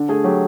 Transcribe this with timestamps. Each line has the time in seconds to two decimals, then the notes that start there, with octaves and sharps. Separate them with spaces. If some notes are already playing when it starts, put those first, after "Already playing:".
Already playing: D3
0.09 A3 G#4
0.24 F#3 G4